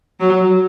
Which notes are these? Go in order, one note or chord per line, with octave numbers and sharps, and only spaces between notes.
F#3